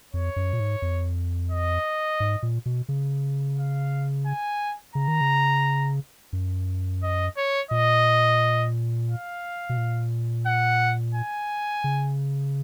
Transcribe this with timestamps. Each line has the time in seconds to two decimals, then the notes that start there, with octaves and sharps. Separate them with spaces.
0.13 F2 C#5
0.36 F#2
0.53 A#2
0.60 G#2
0.82 F2
1.51 D#5
2.20 G#2
2.43 A#2
2.66 B2
2.89 C#3
3.58 F5
4.27 G#5
4.95 C#3 A#5
5.08 D#3
5.21 C#3
6.33 F#2
7.03 D#5
7.37 C#5
7.71 A#2 D#5
9.09 F5
9.69 B2
9.77 A#2
10.46 F#5
11.15 G#5
11.84 C#3